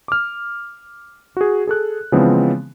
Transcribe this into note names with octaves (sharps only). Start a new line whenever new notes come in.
D6 F6
F#4 G#4
G#4 A4 F#6
C#3 E3 F3 G#3 B3 C4